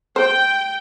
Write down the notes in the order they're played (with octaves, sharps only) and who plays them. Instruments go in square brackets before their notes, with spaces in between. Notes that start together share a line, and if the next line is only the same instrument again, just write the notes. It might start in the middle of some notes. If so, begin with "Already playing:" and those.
[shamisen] C5 [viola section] G5